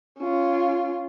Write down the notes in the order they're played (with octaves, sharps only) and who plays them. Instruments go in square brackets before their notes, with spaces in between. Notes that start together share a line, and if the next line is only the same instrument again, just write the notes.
[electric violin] C#4 F4